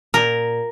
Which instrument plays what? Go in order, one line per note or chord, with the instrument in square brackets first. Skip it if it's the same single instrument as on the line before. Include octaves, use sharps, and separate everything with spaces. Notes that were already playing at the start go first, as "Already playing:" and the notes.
[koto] A#2 A#4